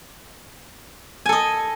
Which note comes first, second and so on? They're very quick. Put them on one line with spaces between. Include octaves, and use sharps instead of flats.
G#5 A4 D#5